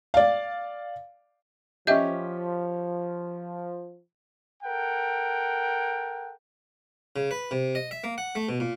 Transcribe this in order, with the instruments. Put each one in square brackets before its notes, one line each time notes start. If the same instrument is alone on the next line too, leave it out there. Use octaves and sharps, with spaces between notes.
[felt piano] D5 F5
[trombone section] F3 [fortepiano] C#4 G4 [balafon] D#5 [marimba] E5 G6
[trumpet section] A4 A#4 F#5 G5
[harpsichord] C#3
B4
C3
D#5
E5
A#3
F#5
A3
B2
A#2